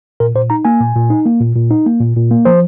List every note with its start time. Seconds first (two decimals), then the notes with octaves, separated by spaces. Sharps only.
0.20 A#2 A#4
0.35 A#2 C5
0.50 D#4 A#5
0.65 A#3 G#5
0.81 A#2
0.95 A#2
1.10 D#4
1.26 A#3
1.40 A#2
1.56 A#2
1.71 D#4
1.86 A#3
2.00 A#2
2.16 A#2
2.31 A#3
2.45 F3 C5